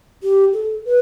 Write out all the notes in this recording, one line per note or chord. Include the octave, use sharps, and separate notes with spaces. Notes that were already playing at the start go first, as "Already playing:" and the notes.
G4
A4
B4